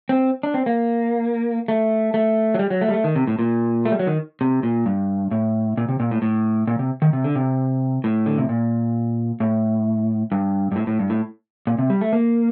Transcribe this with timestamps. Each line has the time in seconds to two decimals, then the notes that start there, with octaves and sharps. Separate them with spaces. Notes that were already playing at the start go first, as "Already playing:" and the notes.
0.09 C4
0.43 D4
0.54 C4
0.66 A#3
1.68 A3
2.14 A3
2.54 F#3
2.59 G3
2.70 F#3
2.81 A3
2.88 G3
2.93 A3
3.04 D#3
3.16 C3
3.27 A2
3.39 A#2
3.85 A3
3.92 G3
3.99 F#3
4.07 D#3
4.41 C3
4.63 A#2
4.86 G2
5.31 A2
5.77 A#2
5.89 C3
6.00 A#2
6.11 A2
6.22 A2
6.67 A#2
6.79 C3
7.02 D#3
7.13 C3
7.24 D3
7.36 C3
8.04 A2
8.26 D3
8.38 C3
8.49 A#2
9.40 A2
10.32 G2
10.72 G2
10.76 A2
10.87 A2
10.99 G2
11.10 A2
11.67 A#2
11.78 C3
11.90 G3
12.01 A3
12.13 A#3